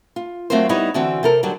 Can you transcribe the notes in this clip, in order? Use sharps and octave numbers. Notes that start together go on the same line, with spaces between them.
F4
F#3 A3 C4 F4 A#4 C5
G3 B3 D#4 E4 C#5
D3 E3 C4 F#4
C3 A4 A#4
D3 F#3 G3